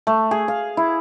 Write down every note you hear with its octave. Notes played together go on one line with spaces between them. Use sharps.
A3
G#4
F5
E4